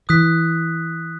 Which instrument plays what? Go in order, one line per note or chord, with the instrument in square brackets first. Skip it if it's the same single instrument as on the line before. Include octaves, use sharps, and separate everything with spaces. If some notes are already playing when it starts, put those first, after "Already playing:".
[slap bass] E3 [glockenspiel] D#6 F#6 B6